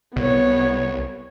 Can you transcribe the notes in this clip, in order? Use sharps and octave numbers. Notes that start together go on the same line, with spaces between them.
C2 B3 C#5